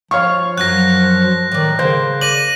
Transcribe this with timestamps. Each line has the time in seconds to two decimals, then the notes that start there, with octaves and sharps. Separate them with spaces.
0.11 F3 F4 C#5 F5 C#6
0.57 F#2 F#3 F#6 A#6
1.51 A2 D#3 D5
1.79 C#3 A#3 C5
2.21 D5 A#6 D#7 F#7